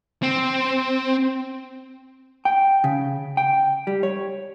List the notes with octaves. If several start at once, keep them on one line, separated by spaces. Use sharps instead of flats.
C4
G5
C#3
G5
G3
C#5